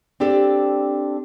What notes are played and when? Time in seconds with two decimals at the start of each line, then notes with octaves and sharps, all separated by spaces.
0.20 C4 D4 G4 A4